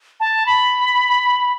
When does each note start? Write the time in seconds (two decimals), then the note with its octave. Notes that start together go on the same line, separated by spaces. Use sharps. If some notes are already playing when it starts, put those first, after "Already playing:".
0.20 A5
0.46 B5